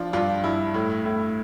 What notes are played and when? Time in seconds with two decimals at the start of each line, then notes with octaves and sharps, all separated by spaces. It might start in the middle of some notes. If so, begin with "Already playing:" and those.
Already playing: F3 D4 F4
0.13 G2 D4 F4
0.44 G2 E4
0.74 A2
1.05 A2